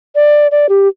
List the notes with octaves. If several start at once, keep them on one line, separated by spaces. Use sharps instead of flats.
D5
D5
G4